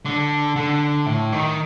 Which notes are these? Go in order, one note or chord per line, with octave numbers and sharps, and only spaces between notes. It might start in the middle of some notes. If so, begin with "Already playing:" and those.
D3
D3
A2
D#3